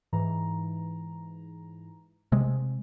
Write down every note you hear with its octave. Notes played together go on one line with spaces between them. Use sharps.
G#2 E3 A#5
C3 G#3